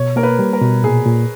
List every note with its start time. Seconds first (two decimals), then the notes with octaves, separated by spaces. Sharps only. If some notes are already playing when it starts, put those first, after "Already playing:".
Already playing: B2 C#5
0.16 A#3 A#4
0.23 B4
0.39 G3
0.53 A#4
0.61 B2
0.83 A#2 G#4
1.06 A#2